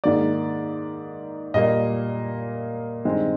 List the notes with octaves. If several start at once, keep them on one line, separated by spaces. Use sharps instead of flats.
G#2 D#3 A#3 D5
A#2 G3 A#3 D#5
G2 D#3 G#3 C4